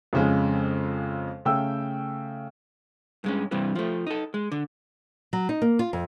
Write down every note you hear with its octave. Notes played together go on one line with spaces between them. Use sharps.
F2 C#3 G#3
C#3 A3 G5 E6
G2 G#3 C#4
G2 C3 E3 G3
F3 A3
D#4 A4
G#3
D3
F#3
D#4
A#3
F4
F2